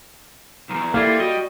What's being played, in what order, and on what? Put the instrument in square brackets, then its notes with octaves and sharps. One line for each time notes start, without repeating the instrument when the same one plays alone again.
[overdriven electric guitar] B1 E2 [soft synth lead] A#5
[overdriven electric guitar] G3 [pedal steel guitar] A#3 E4 F4 [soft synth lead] A4
[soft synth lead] F#4 [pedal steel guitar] D#5